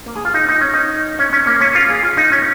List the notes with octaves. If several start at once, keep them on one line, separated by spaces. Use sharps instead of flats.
A#3
G#4
F4
D#4
D#4
C#4
D#4
C#4
C#4
A#3
C#4
F4
G#4
F4
D#4
C#4